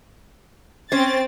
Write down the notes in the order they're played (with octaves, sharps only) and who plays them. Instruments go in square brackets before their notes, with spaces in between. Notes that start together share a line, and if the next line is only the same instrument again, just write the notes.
[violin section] C4 A6 [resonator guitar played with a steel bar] C#4 C5